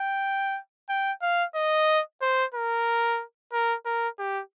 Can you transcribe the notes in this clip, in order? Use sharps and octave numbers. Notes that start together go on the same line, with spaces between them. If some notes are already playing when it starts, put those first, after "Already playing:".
Already playing: G5
G5
F5
D#5
C5
A#4
A#4
A#4
G4